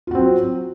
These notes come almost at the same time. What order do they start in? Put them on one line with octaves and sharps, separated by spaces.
F4 F#4 C4 F#3